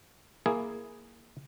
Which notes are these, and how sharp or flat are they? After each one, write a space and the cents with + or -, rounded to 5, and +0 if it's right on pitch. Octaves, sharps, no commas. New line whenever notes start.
A#3 +0 E4 +0 G#4 +0